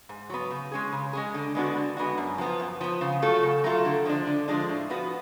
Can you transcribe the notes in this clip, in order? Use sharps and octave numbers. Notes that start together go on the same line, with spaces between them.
G#2
F#3 B3
C#3
G#3 C#4 G#4
C#3
G#3 C#4 G#4
D3
G#3 B3 D4 F#4
D3
G#3 B3 D4 F#4
F#2
F3 B3
F#2
F3 B3
C#3
F#3 A3 F4 A4
C#3
F#3 A3 F4 A4
D3
F3 G#3 D4
D3
F3 G#3 D4
A2
F3 B3 F#4 B4